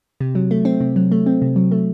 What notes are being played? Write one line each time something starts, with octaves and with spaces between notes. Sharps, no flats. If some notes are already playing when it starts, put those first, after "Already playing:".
C3
F#3
A3
C4
C3
F#3
A3
C4
C3
F#3
A3